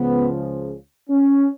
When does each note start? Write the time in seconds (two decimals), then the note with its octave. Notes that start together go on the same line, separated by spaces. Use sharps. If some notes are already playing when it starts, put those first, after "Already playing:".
Already playing: C#2 C#3 F3 B3
1.10 C#4